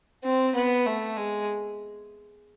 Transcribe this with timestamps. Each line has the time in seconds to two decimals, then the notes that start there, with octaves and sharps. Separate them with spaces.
0.24 C4
0.55 B3
0.86 A3
1.17 G#3